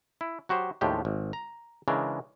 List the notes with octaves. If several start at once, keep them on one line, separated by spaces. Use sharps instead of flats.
E4
F#3 F#4 G4 C5
D#2 A2 F3 G#3 D4 G4
G#1
A#5
C#3 E3 G#3 D4 A#4